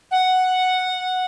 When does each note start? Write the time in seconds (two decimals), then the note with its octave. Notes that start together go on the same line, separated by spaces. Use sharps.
0.11 F#5